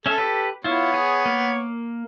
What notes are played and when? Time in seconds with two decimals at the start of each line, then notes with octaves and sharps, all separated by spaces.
0.06 C#4 A4 E5
0.18 G4 B4
0.64 B3 E4 F4 C#5
0.94 G#4
1.26 A#3